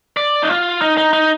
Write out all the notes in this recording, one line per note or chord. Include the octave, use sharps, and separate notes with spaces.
D5
D#4
F4
D#4
D#4
D#4